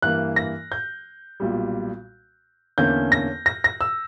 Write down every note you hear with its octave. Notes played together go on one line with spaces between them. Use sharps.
G2 E3 A#3 F#6
A#6
G6
B1 A#2 G3
E2 D3 A#3 C#4 G6
A#6
A#6
A#6
E6